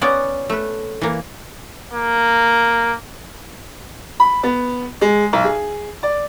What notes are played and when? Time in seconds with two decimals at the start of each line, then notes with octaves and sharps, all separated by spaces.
0.01 B3 C#4 D5 F#5
0.50 A3 B4
1.01 E3 A#3
1.93 A#3
4.20 B5
4.43 B3
5.01 G#3
5.33 B1
5.44 G#4
6.03 D5